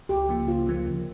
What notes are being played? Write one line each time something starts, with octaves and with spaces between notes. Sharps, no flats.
C#2 G4
C#3 F3 A#3
C#2 F4
C#3 F3 A#3
D2